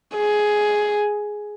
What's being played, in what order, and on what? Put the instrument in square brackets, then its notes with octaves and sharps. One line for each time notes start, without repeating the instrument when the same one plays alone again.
[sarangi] G#4